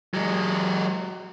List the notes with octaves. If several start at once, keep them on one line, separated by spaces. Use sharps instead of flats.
F#3 G#3